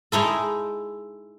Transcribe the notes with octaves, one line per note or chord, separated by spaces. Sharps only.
G#3 D#4 E4 A4